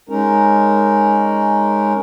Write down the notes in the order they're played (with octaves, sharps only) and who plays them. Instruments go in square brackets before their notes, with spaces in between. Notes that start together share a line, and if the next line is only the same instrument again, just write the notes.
[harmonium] G#3 C#4 D#4 A#4